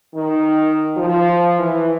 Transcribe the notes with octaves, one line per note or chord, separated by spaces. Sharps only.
D#3
F3
E3